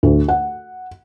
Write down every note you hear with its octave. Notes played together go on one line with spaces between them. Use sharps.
D2
F#5